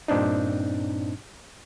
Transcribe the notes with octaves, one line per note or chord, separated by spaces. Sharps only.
G2 A#2 C4 D4 D#4